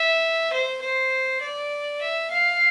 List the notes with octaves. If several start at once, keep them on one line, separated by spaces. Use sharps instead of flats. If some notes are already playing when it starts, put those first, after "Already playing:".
Already playing: E5
C5
C5
D5
E5
F5